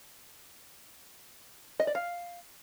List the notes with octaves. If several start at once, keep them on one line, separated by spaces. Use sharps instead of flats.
D#5
D5
F5